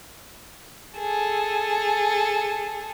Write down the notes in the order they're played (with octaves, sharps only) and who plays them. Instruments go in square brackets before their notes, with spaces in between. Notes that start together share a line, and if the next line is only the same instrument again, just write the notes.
[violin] G#4 A4